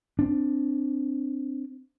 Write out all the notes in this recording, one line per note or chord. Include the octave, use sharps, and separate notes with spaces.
C4 D4